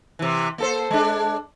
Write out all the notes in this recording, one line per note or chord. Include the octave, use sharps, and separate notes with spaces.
C3 E3
A#3 A4 C5
G#3 D4